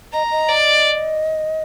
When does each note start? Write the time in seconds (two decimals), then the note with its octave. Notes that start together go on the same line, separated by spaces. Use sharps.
0.13 D#5 A#5
0.31 D#5
0.49 D5